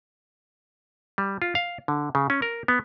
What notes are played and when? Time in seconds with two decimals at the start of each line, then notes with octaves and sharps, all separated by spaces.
1.18 G3
1.42 F4
1.55 F5
1.88 D3
2.15 C#3
2.30 C#4
2.42 A#4
2.68 B3